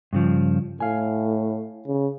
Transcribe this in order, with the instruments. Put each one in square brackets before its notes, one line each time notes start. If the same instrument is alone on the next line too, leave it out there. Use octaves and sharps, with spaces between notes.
[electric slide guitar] G2 C#3 F3
[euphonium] A2 [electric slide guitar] F5 G#5
[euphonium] C#3